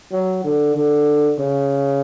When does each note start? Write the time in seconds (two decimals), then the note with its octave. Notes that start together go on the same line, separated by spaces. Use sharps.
0.12 F#3
0.44 D3
0.75 D3
1.38 C#3